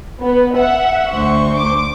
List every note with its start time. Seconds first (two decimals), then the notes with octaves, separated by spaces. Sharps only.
0.21 B3 B4
0.56 E5 F#5
1.10 D2 C5 C#6
1.56 D6